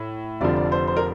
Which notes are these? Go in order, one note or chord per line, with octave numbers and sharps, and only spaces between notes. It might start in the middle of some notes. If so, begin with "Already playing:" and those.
Already playing: A2
F1 F2 D3 F3 D5
D5
C5
C5
A#4